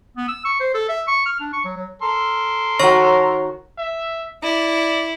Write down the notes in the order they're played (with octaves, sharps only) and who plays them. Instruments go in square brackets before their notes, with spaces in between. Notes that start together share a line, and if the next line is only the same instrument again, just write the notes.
[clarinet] B3
E6
C#6
C5
A4
E5
C#6
F6
D4
C#6
F#3
F#3
[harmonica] A4 A#4 C6
[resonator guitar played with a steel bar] D#3 F#4 [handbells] C#5 C#6 A#6
[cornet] E5
[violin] E4 [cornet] D5